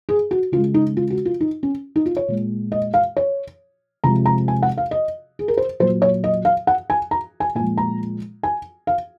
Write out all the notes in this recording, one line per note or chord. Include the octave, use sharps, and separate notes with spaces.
G#4
F#4
C#3 G#3 F4
D#4
F4
F#4
F4
D#4
C#4
D#4
F4
C#5
A#2 G#3
D#5
F5
C#5
C3 F3 G#3 A#5
A#5
G#5
F#5
F5
D#5
G#4
A#4
C5
A#2 F#3 C5
C#5
D#5
F5
F#5
G#5
A#5
G#5
A#2 F3 G#3 G#5
A#5
G#5
F5